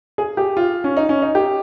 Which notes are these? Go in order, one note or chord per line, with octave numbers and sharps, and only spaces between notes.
G#4
G4
F4
C#4
D#4
C#4
D#4
G4